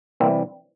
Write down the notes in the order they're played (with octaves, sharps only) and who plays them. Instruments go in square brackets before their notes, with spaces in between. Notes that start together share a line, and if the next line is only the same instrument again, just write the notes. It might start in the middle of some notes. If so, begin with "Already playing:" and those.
[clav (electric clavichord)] C3 E3 G3 A#3 C4